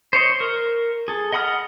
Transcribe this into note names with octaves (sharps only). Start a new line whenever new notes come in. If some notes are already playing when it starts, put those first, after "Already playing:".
C5 C#5 D#5 C6
A#4
G#4 A4
D#5 F#5 B5 D#6 F6